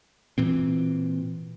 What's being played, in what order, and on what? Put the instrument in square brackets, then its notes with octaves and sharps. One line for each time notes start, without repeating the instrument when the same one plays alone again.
[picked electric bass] A#2 E3 C4